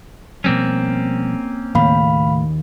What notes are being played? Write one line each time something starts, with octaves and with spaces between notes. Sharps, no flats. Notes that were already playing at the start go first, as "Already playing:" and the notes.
B2 F3 G3 A#3 C4 C#4
D#2 A2 C#3 A3 F5 B5